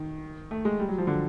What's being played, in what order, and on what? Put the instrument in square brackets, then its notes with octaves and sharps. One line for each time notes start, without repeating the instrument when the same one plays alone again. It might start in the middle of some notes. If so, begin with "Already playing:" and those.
Already playing: [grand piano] D#3
A3
G#3
G3
F#3
F3
D3